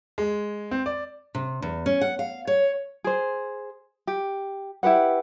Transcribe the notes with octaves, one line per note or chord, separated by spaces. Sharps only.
G#3
C4
D5
C3
E2
C#4
F#5
F5
C#5
G#4 C5
G4
E4 G4 B4 F#5